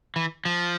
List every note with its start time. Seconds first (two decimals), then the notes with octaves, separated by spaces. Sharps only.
0.16 E3
0.45 F3